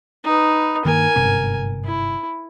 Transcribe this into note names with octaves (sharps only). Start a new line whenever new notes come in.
D#4 B4
G2 D#3 A#3 A#4 G#5
G1 G#2 C3
E4